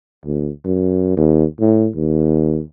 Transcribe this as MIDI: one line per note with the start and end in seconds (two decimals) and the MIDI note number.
0.25 0.50 38
0.65 1.13 42
1.17 1.45 39
1.60 1.88 45
1.95 2.62 39